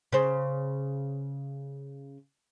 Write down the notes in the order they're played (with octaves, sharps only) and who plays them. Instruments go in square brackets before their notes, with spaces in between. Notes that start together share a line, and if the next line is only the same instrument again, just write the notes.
[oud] C#3 C5